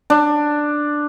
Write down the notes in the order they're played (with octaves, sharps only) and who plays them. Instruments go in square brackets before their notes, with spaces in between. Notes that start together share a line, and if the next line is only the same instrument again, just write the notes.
[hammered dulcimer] D4